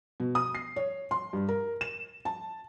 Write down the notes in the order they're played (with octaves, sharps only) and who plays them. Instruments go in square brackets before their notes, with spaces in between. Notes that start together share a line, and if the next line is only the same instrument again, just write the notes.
[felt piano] B2
D#6
C7
C#5
C6
G2
A#4
E7
A5